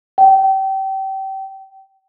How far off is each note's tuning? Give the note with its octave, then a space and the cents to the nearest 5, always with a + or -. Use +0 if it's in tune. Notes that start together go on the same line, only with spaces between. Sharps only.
G5 -25